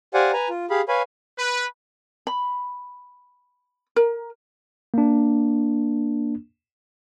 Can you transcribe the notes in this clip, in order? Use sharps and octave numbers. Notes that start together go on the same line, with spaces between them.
G4 C5 D5 F5 F#5 G#5
B4 G#5 A#5
F4
G4 G#4 F5 B5
B4 C#5 F5 G#5 B5
B4
B5
A#4
A#3 D4